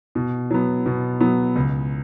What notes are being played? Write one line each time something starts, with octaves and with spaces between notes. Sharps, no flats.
B2
F#3 B3
B2
F#3 B3
C#2